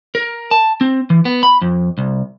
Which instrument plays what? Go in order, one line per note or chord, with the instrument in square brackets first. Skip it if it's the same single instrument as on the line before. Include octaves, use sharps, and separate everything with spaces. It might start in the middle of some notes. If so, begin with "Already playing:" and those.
[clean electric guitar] A#4
A5
C4
E3
B3
B5
F2
C2